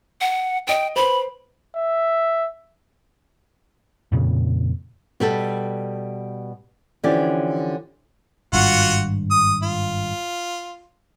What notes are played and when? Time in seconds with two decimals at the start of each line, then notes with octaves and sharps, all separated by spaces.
0.21 F#5
0.67 D#5 G5 D7
0.96 B4 C5 B5
1.76 E5
4.12 F2 A#2 C#3
5.20 B2 G3 A4
7.04 D3 E3 F3 C#4 G4 D5
8.53 G#1 G2 F4 F#4 F#5
9.31 D#6
9.63 F4